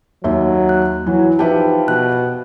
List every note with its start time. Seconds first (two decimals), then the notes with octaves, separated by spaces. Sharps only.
0.24 D#2 F#3 E5
0.69 F#6
1.06 E3 F#3
1.39 F3 D#4 G4 B4 E5 G5 A5
1.88 B2 F#6